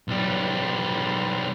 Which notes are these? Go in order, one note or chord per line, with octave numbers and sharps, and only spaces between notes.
B1 G3